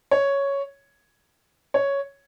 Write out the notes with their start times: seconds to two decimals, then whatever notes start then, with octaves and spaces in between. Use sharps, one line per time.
0.11 C#5
1.74 C#5